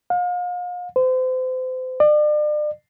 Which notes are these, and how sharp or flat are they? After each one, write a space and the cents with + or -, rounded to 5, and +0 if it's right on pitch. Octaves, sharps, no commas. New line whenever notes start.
F5 +40
C5 -35
D5 +35